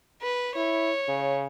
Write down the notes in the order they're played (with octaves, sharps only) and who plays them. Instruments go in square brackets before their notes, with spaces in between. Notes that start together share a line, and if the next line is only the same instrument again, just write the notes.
[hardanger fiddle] B4
[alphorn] E4 [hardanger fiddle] C#5
[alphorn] C#3